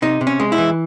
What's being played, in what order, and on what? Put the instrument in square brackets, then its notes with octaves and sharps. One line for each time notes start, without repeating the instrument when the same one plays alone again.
[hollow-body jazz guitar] C3 D#4
C3
C#4
G#3
E4
E3